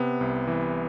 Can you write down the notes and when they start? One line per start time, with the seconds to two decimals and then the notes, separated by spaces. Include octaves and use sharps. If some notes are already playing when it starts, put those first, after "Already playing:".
Already playing: C3 B3
0.21 C2
0.47 E3